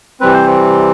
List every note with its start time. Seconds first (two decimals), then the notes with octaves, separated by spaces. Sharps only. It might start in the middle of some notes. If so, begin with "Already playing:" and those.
0.20 C3 E3 G3 C4 B4
0.34 C5